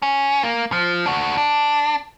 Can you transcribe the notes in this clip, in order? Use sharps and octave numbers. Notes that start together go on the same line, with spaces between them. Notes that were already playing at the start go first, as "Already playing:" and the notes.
C#4
A#3
F3
D4 F#4
D4